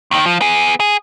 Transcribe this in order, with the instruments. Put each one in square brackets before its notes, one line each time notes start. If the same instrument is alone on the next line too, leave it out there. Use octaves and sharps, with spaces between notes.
[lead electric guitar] D#2 D#3
F3
B3 G#4
G#4